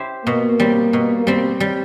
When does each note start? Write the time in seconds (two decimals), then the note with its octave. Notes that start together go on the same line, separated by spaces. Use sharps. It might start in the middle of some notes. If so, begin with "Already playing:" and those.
Already playing: E4 G4 C5
0.26 B2 A#3
0.60 G3 C4
0.93 B2
1.27 G3 C4
1.60 G3